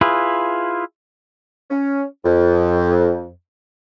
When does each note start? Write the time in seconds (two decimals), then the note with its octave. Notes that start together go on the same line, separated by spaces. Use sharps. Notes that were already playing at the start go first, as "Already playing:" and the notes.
0.01 E4 F4 G#4 B4
1.70 C#4
2.25 F2